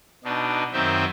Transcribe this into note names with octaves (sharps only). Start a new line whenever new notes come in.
B2 D4 D#4
F#2 D#3 C4 D#4 C5 E5